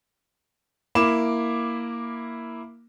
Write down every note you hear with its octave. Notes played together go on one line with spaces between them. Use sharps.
A#3 E4 B5 D6 E7